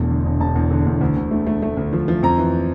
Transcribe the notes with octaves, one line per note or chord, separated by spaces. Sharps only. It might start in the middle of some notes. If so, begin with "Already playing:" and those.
Already playing: E1 E2 A3
D3
E1
E1 A5
E2
D3
E2
D2
D2
A3
A3
A3
D2
F3
F3
F2 A#5
E3